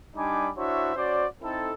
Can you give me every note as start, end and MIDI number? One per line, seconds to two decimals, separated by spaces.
0.16 0.50 55
0.16 0.50 62
0.16 0.50 63
0.16 0.50 80
0.16 0.50 83
0.16 0.50 86
0.56 0.91 62
0.56 0.91 64
0.56 0.91 66
0.56 0.91 72
0.56 0.91 73
0.56 0.91 76
0.95 1.26 61
0.95 1.26 66
0.95 1.26 72
0.95 1.26 74
1.42 1.73 60
1.42 1.73 63
1.42 1.73 64
1.42 1.73 69